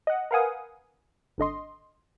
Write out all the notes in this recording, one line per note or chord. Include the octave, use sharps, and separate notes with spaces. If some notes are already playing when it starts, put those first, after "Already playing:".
D#5 F#5
A#4 B4 F5 F#5 G#5 D#6
G#1 D3 D#5 C6